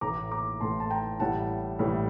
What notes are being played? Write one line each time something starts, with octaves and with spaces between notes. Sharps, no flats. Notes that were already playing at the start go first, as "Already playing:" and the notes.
A1 A2 A3 A#5 D6
A#5 D6
A1 A2 A3 A5 C6
A5
G5 A#5
A1 A2 G3 F#5 A5
A1 A2 G3